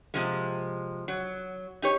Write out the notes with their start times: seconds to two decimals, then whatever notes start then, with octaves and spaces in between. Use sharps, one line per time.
0.14 C3 F3 G#3
1.08 F#3
1.82 D#4 G4 C#5